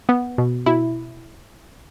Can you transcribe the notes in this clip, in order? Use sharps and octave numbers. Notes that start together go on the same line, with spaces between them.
B3
B2
B2 E4